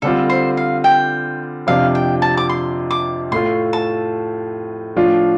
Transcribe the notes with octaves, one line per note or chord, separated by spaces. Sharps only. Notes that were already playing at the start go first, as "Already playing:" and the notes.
D3 G3 C4 F4 A4
C5
F5
G5
F2 C3 F3 D4 F4 F5
G5
A5
D6
C6
D6
A2 A3 F4 C6
A5
A2 F3 D4 F4